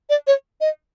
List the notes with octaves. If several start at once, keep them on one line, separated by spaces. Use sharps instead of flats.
D5
C#5
D#5